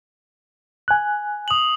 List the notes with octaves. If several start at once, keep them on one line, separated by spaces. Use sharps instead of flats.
G#5 F#6
D#6 F#7